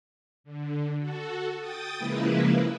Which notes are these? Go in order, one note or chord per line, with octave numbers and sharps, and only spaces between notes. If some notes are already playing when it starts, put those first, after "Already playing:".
D3
F#4 A4
G5 D#6 A6
C#3 F3 G#3 A#3 E4 B4